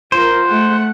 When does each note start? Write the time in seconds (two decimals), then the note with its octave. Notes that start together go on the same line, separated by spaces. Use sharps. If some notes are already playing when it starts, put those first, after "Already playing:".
0.12 F4 A#4 C5
0.47 A3 F#5